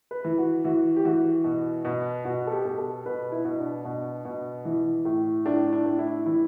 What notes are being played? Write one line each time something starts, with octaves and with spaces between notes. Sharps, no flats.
B4
E3
F#4
E3 F#4
G4
E3 F#4
B2
B2
B2 F#4
A4
G4
B2
A4
B2 B4
E4
B2
D4
B2
B2
E3
A2
A2 D4
D4
A2
E4
E3 E4